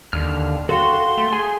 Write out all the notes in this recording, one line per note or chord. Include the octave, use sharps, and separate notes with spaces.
D#2 D3 F6
F#4 A4 F5 G5 C6
A3
G#4 G#5